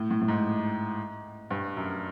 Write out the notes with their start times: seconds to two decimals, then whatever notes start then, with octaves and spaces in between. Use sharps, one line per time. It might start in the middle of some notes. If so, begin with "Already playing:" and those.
Already playing: A2
0.11 A2
0.21 A2
0.28 G#2
1.50 G2
1.77 F#2